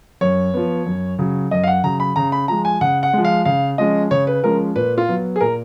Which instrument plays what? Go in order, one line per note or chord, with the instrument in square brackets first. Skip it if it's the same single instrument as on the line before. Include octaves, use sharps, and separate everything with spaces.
[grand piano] F#2 C#5
F3 B3
F#2
C#3 F#3
F#2 D#5
F5
F#5
C#3 F#3 A#5
B5
C#3 A#5
B5
F3 G#3 A#5
G#5
C#3 F#5
F#5
F3 G#3
F5
C#3 F5
F3 G#3 C#4 D#5
C#3 C#5
B4
F3 G#3 C#4 A#4
A#2 B4
F4
F#3 B3
G#4
A#2 A#4